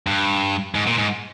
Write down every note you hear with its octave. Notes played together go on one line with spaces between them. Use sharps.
G2
G#2
A#2
G#2